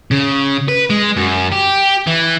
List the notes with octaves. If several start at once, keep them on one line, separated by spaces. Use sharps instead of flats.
C#3
B4
G#3
F#2
G4
E3